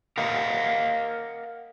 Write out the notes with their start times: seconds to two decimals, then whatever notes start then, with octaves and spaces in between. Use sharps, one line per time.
0.18 A#4 D#5 F5 F#5 A#5